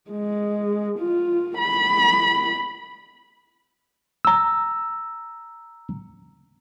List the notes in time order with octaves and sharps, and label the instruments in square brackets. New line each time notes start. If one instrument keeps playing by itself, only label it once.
[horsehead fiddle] G#3
F4
B5
[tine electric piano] A#5 E6